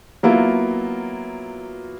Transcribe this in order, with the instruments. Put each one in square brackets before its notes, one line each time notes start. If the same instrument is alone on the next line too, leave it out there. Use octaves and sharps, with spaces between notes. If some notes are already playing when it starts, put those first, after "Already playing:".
[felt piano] F#3 A#3 B3 E4 F4